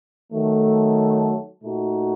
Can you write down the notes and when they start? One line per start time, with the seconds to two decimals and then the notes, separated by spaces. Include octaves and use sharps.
0.33 D#3 F#3 A3
1.63 A#2 A3 D#4 F#4